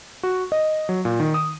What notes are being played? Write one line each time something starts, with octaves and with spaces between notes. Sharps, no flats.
F#4
D#5
F#3
A#2
D#3
D#6